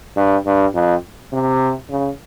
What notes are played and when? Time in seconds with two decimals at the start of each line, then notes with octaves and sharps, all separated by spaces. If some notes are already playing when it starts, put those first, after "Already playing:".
0.16 G2
0.46 G2
0.74 F2
1.32 C3
1.90 C#3